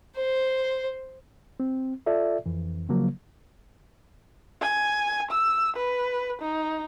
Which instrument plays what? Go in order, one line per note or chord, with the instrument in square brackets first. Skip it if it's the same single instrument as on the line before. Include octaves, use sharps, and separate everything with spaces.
[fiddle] C5
[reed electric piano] C4
F4 A4 D5 E5
F2 E3
C#3 F3 F#3 A#3
[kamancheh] G#5
E6
B4
D#4